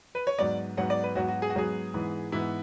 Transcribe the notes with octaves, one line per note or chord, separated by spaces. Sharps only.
B4
C#5
G#2 F#3 B3 D5
G#2 F#3 B3 F#5
D5
B4
G#2 F#3 B3 F#4
F#4
G#4
F#4
G#2 F#3 B3 G#4
G#2 E3 B3
G#2 E3 B3 E4